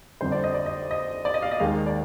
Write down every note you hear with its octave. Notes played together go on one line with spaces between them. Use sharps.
G1 F2 D3 G3 C5
D5
D#5
D5
D#5
D#5
D5
D#5
F5
D#5
D#2 D#3 G#3 F5
D5